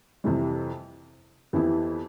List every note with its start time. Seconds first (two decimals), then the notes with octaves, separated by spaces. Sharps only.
0.24 F2 C3 E3 G3
1.53 F2 E3 B3 E4 G4